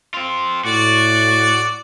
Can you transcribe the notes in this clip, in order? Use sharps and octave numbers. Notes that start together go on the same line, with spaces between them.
C4 F4
A2 F#4 D5